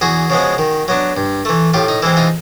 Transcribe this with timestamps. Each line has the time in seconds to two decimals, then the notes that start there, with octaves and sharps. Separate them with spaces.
0.01 E2 F#4 G#4
0.30 C#3 F3 G#3 B3
0.58 D#3
0.88 F#3 B3 D4
1.17 G2
1.45 E3 A3
1.74 A2 F4 G4
1.88 D#4
2.02 E3 G#3 C4 E4
2.17 D#4 F4